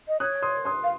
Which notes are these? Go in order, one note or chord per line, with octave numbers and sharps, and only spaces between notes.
D#5
C#5 D#6 F#6
C6 D#6
C6 D#6
F5